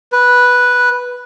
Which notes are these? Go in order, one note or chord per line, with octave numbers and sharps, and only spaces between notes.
B4